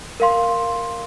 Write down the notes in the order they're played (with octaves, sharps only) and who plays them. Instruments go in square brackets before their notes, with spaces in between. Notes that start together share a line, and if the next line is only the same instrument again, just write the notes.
[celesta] A#4 F5 C6